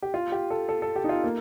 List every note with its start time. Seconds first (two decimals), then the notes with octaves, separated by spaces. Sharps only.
0.02 G4
0.14 F4
0.32 G4
0.50 A4
0.69 A4
0.82 A4
0.96 G4
1.04 D#4
1.09 F4
1.24 A#3